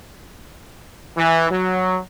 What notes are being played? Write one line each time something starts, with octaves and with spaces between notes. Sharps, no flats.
E3
F#3